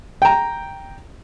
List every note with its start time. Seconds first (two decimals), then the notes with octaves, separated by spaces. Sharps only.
0.22 G5 A#5